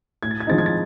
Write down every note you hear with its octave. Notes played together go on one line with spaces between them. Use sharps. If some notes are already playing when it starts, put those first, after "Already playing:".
A2 G#6
A6
G#6
F3 G#3 C4 D#4 A6
G#6
A6